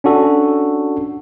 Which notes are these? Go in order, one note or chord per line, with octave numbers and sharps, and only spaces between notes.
C#4 D4 F#4 A4